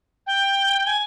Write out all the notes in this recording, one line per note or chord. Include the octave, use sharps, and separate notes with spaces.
G5
G#5